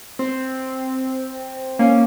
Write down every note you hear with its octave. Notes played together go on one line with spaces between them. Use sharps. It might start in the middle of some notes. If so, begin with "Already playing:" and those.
C4
A#3 C#4